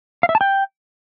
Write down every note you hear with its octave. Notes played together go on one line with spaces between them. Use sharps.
F5
E5
A5
G5